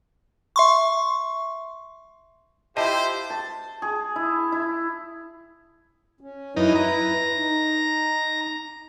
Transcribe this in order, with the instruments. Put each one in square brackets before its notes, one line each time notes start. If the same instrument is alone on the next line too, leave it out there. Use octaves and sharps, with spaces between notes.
[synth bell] E5 C6 C#6
[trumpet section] E4 F4 G4 [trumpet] C5 [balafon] D#5 E5 A5
[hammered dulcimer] A5
G#4
E4
E4
[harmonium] C#4
[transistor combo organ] F#2 D#4 [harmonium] E4 B4
[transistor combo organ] A#5
[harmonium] D#4